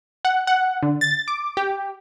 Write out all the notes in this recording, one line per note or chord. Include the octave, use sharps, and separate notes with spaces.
F#5
F#5
D3
A6
D6
G4